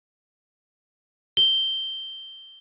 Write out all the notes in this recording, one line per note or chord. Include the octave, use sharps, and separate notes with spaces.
G7